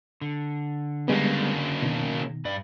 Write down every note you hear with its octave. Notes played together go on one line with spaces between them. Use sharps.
D3
C#3 G3 G#3 A#3 B3
B2 D#3
G2 B4 D5